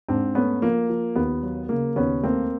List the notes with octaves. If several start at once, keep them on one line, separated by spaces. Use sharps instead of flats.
G#2 C4 D4
A3 B3 C#4
F3 A#3
F3
D#2 B3
F#3
C#3 A#3
D#2 B3 C#4
A3 A#3 C4